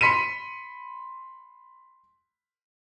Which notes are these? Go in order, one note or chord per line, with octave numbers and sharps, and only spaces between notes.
B5 C6 B6 C#7 D#7